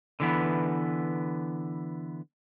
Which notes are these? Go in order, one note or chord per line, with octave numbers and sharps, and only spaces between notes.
D3 E3 B3